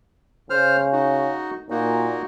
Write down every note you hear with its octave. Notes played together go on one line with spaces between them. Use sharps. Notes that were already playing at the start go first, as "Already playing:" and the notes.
C#3 C5 F6
D#4 F#4
A#2 A#3 D#4 F#4